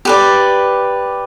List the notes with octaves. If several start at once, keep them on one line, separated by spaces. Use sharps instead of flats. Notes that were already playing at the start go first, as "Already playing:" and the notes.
G4 B4 D5